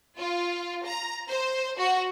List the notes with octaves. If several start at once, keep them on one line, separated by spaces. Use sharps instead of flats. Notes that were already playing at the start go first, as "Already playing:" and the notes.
F4
A#5
C5
F#4